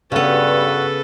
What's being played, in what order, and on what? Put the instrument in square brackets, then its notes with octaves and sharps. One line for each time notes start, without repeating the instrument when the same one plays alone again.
[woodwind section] G2 [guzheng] C#3 B3 [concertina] F#4 [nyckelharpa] A4 B4